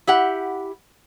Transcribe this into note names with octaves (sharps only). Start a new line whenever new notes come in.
E4 G4 F#5